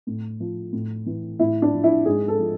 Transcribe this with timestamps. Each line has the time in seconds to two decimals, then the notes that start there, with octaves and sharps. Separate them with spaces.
0.07 A2
0.40 F3
0.73 A2
1.06 E3
1.39 A2 E4
1.62 D4
1.73 F3
1.84 E4
2.05 G#2 G#4
2.28 A4
2.39 F3